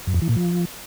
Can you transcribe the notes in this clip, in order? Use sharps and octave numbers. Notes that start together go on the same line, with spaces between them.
F#2
F2
E3
A#2
F3